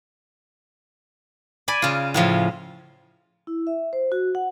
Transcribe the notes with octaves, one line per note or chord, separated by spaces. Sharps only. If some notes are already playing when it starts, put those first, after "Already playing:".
D5 G#5 B5
C#3 F4
A2 C#3 F3
E4
E5
C5
F#4
F#5